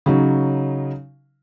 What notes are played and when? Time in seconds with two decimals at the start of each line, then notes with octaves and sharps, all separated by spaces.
0.06 C#3 F#3 D#4